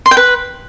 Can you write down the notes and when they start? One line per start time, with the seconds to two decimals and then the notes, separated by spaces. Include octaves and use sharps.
0.06 C6
0.11 G5
0.17 B4